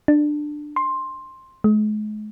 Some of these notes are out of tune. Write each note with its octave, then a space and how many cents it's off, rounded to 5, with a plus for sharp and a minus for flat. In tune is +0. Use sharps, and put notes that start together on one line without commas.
D4 +15
C6 +10
G#3 +40